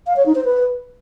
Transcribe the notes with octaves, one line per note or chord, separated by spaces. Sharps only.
F5
C#5
D#4
C5
B4